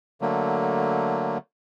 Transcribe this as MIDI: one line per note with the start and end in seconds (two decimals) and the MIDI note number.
0.21 1.38 50
0.21 1.38 54
0.21 1.38 57
0.21 1.38 58